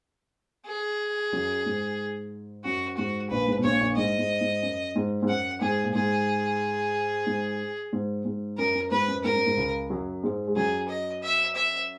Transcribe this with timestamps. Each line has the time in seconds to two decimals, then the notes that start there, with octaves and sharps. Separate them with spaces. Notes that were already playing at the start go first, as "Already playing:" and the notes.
0.66 G#4
1.33 F#2 F#3
1.66 G#2
2.64 F#2 F#4
2.98 G#2 F#4
3.30 A#1 A#2 B4
3.47 G#2
3.57 B2
3.63 A#1 A#2 C#5
3.80 A#1 A#2
3.96 G#2 D#5
4.19 G#2
4.41 G#2
4.63 F#2
4.95 G#2
5.22 G#2
5.29 F#2 F#5
5.61 G#2 G#4
5.84 A#2
5.95 G#2 G#4
7.26 G#2
7.93 G#2
8.25 G#2
8.58 F#2 A#4
8.75 F#2
8.91 G#2 B4
9.08 F#2
9.24 G#2 A#4
9.35 F#2
9.46 G#2
9.57 C#2 C#3
9.90 F#2 F#3
10.23 G#2 G#3
10.47 G#3
10.56 F#2 F#3 G#4
10.89 D#5
11.23 E5
11.56 E5